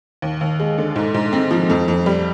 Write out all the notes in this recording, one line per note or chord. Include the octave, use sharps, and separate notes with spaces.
D#2
D#2
G#3
D3
G#2
G#2
C4
F3
F2
F2
G3